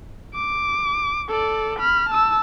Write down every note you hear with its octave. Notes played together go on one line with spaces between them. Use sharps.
D6
A4 D5
B5 F6
A5 E6